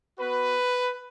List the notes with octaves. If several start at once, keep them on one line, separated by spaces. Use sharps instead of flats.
B3 F#4 B4